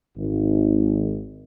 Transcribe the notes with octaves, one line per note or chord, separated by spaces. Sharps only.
G#1